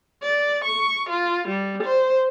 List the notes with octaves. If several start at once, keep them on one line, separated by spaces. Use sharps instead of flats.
D5
C#6
F4
G3
C5